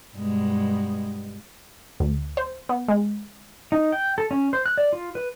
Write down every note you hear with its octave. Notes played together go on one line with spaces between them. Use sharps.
G2 B2 G#3
D2
C5
B3
G#3
D#4
G5
A4
C#4
C5
F#6
D5
F4
B4